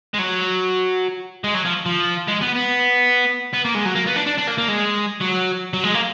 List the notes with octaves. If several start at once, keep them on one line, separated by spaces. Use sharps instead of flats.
G#3
F#3
G#3
F#3
F3
F3
G#3
B3
B3
B3
A#3
G#3
F#3
A#3
B3
D4
D4
D4
A#3
A#3
G#3
F#3
F#3
G#3
A#3